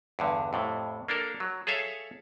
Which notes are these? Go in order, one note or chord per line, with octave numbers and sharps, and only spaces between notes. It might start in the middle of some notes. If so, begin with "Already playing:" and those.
E2 G2 D3
F2 A2 C3
A#3 D4 A4 A#4
F#3
G#4 A4 C#5 E5 F5